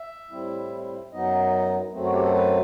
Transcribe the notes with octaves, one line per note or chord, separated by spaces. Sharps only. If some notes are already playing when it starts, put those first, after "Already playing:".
Already playing: E5
A2 G3 C4 E4
F#2 F#3 B3 D#4 D#5
F#2 F#3 A3 C4
F#4
G4
A4
B4